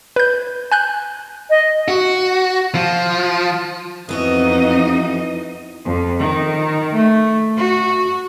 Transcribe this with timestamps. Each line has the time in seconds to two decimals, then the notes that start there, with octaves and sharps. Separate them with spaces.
0.16 B4 G6
0.72 G#5 F#6 G6
1.50 D#5
1.88 F#4
2.75 F3
4.09 F2 E3 B3 D#4 F#4 D#5
5.85 F2
6.21 D#3
6.95 A3
7.57 F#4